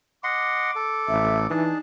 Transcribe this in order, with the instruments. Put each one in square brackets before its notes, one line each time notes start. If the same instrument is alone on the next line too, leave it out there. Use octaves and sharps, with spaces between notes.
[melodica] D#5 F#5 C6 [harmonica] D6
[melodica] A4
[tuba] A1 [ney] E5
[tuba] E3 [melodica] D4 G#4 A5 [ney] D#4